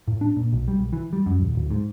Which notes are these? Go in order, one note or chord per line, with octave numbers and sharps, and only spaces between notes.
A2
D4
A#2
B1
G3
B1
E3
G3
F#2
D#1
D1
G#2